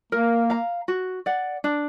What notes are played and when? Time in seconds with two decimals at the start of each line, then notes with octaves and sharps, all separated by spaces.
0.12 A#3 A#4
0.50 F5 A#5
0.88 F#4
1.26 D5 F#5
1.64 D4